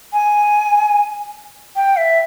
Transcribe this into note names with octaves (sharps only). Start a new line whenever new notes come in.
G#5
G5
E5